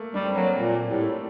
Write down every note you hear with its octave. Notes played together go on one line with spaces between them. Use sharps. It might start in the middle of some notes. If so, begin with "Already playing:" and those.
Already playing: A3 A#3
G3 D4
C4
F#3 A#3
C4
A#2 A#3
A2 G3
A3